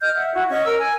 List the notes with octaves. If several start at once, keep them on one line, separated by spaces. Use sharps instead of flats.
D#5 F6 G6
E5 F#5
E4 F#4
C#4 D#5 C#6
A#4 E6
G#5